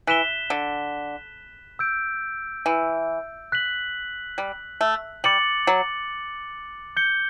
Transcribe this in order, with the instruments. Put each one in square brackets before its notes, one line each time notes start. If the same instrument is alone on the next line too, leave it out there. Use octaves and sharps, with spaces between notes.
[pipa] E3 [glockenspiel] F#6 B6 E7 G7
[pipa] D3
[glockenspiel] E6 G6 D7
[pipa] E3
[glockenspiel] F#6 B6 F#7
[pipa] G3
A3
[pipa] G3 [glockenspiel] D6 A6 C#7 F#7
[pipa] F#3
[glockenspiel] G6 C#7 G7